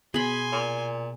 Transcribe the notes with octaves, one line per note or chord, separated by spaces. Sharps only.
B2 G#4 G#5 B5 C6
A#2